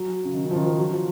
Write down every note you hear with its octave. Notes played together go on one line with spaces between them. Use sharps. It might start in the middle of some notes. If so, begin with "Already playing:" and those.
Already playing: F#3
C#3
D#3
C#3
F3
D#3
F3
F#3
F3